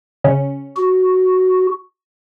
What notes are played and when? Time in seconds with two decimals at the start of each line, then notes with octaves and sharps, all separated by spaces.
0.24 C#3 C#4
0.77 F#4